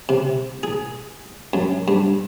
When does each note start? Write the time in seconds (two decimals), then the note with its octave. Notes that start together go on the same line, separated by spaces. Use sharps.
0.09 C3
0.63 G#4
1.53 F#2
1.88 G2